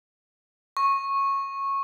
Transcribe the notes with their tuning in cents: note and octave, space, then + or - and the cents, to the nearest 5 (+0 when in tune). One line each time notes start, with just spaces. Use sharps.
C#6 -15